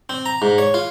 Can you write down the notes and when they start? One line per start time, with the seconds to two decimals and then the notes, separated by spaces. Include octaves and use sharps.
0.09 C4
0.26 A#5
0.42 G#2
0.58 C#5
0.74 F4